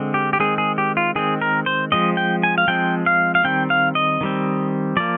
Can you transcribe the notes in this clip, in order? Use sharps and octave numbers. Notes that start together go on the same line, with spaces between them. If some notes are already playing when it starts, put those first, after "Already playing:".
Already playing: D3 G#3 C4
G4
G4
D#3 G#3 C4 G#4
G#4
G4
F4
D#3 G#3 C4 G#4
A#4
C5
F3 G#3 C4 D#5
G5
G#5
F5
F3 G#3 C4 G5
F5
F5
D#3 G3 C4 G5
F5
D#5
D#3 G3 C4
F3 A#3 D5